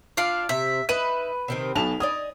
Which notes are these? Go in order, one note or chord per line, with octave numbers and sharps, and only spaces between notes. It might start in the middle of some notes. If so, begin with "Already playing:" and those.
D4 F4 D5 F5
C3 E5
D#4 B4 E5 D#7
C3 D#3 C4
B1 B2 A5 F7
D5 D#5 G#5 D#6